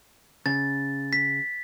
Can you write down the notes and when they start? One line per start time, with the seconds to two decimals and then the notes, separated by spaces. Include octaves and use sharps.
0.46 C#3 A6
1.13 B6